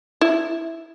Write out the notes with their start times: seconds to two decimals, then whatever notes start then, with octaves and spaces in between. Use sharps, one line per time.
0.21 E4